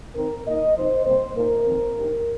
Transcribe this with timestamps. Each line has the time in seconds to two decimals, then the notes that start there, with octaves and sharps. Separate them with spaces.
0.15 D#3 C4 D#4 A#4
0.45 A#2 A#3 D#4 D#5
0.75 C3 F3 D#4 C5
1.05 C3 G3 A#3 C5
1.36 A#2 A#3 D#4 A#4
1.66 F2 D#3 C4
1.96 G2 G3 D#4